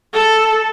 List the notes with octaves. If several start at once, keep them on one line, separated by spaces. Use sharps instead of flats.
A4